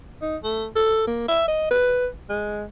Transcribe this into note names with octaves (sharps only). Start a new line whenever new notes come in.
D#4
A3
A4
A#3
E5
D#5
B4
G#3